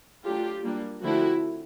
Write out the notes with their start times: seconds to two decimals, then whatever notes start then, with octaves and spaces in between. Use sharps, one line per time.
0.24 F#3 A3 D4 F4 G4
0.64 G3 A#3 D4
1.03 D3 F3 A3 C4 E4 F#4